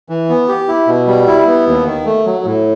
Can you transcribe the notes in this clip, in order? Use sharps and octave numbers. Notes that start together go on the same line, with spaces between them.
E3
B3
G4
E4
B2
G3
E4
B3
D#2
D#3
A3
F#3
A2